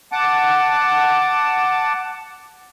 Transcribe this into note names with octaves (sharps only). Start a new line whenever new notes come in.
F#5 A5 D6